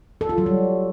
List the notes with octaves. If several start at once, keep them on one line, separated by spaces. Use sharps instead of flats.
A4
F4
F#3
G3